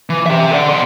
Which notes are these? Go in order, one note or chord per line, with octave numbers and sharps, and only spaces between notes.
E3
G4 E5
A4 D5
B2 C6